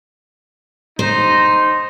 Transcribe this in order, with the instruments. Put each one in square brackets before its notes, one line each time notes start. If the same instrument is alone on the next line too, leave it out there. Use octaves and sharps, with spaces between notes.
[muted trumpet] D#4 [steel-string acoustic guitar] C5